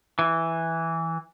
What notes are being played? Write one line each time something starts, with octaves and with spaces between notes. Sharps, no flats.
E3